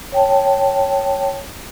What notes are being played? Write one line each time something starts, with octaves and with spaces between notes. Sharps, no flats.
C#5 G5 A5